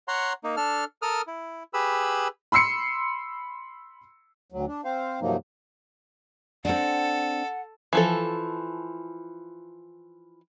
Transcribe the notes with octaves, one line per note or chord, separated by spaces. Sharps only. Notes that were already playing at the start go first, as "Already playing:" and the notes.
C#5 F#5 A#5 C6
A#3 D#4
D4 A4 F6
A4 A#4 D#6 F6
E4
G4 G#4 B4 B5 E6
B5 C6 E6 C7 C#7
D2 F#3
D4
C4 C5 F5
G2 C3 F3 F#3 A#3 D#4
C4 D4 A4 F#5
E3 F3 A4